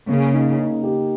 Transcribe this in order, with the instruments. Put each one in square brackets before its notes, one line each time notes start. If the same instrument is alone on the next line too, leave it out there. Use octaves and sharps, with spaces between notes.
[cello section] C#3 [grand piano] A#3
[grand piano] D#4
D#4
G4